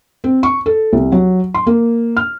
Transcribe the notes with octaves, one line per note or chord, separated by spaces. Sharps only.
C4
C#6
A4
C2
F#3
C6
A#3
F6